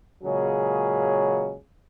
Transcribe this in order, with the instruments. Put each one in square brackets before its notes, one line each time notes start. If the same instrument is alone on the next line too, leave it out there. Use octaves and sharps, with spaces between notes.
[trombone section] A#2 C#3 F#3 G#3 C#4 G#4